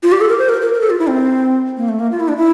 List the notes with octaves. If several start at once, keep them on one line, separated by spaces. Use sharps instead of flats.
F4
G4
A4
A#4
C5
A#4
A#4
A#4
A4
F4
E4
C4
A#3
A3
A#3
F4
E4
D4
E4